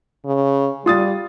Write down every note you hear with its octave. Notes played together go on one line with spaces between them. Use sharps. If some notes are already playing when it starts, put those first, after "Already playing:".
C#3
G3 F4 D#6 A6